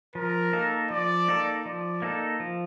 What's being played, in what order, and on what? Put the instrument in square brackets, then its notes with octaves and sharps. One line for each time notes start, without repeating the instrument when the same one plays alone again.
[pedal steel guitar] F3 [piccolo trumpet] A#4
[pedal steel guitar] A#3 D#4 A4
[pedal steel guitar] F3 [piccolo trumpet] D5
[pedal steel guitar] A#3 D#4 A4
[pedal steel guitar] F3 [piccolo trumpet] D5
[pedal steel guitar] A#3 D#4 A4
F3